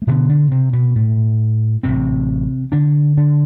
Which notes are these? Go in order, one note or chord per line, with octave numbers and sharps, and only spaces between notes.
A3
A1 G2 B2 D3 B3
D3 D4
C3 C4
B2 B3
A2 A3
A1 A2 C3 C4
D3 D4
D3 D4